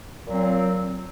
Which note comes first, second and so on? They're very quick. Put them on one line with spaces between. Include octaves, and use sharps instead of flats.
A#2 F#3 C4